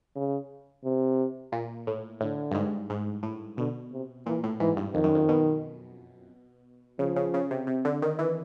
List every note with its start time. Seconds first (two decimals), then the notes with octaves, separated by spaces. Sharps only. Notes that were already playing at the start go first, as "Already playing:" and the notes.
0.16 C#3
0.84 C3
1.52 A#2
1.87 A2
2.21 A2 D3
2.51 G2
2.55 G#2
2.90 G#2
3.23 A2
3.57 B2 D3
3.92 C3
4.26 A#2 E3
4.43 A2
4.60 G#2 E3
4.77 G2
4.94 F2 D#3
5.04 F#2
5.15 F2
5.29 B2
6.99 C#3 F3
7.16 C#3
7.34 C#3
7.51 C3
7.67 C3
7.85 D3
8.02 D#3
8.19 E3